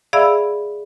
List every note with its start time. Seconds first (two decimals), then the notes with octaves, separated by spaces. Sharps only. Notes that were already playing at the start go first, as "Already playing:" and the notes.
0.13 G#4 D5 E5 F5 B5 E6